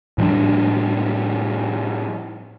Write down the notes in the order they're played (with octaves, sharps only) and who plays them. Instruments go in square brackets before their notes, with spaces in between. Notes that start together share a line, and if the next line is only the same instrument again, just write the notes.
[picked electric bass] A2 F3 G3 D4